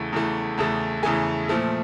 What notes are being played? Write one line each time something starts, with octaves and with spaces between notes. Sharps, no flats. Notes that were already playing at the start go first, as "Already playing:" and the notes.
Already playing: E2 C#3 E3 A3
E2 C#3 E3 A3
E2 C#3 E3 A3 A5
E2 C#3 E3 A3 G#5
A#2 F3 A3